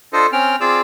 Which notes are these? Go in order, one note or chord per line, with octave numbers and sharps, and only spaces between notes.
D4 F4 A4 C5 D#5
C4 C#4 G5 F6
C4 F4 G#4 D5 D6 E6